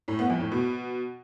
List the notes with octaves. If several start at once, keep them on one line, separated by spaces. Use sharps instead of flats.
A2
B3
F2
A2
B2